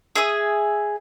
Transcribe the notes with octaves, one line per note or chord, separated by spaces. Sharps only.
G#4 E5 D#6